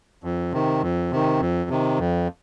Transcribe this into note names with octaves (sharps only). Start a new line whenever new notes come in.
F2
C3 D#3
F2
C3 D#3
F2
C3 D#3
F2